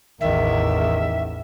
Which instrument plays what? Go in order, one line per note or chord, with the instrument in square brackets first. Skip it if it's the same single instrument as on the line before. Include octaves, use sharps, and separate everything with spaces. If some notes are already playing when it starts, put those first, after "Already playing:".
[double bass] A1 E2 [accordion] D#3 [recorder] E5